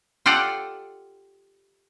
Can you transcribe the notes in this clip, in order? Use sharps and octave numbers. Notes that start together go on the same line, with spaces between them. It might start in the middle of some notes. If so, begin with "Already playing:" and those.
F4 G4 A4 D5 F#5